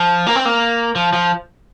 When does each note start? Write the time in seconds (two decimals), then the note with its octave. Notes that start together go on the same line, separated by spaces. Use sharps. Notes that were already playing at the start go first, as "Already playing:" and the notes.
Already playing: F3
0.27 A#3
0.36 C4
0.45 A#3
0.95 F3
1.13 F3